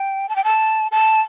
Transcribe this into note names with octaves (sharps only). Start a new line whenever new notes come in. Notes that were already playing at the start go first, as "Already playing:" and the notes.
Already playing: G5
A5
G5
A5
A5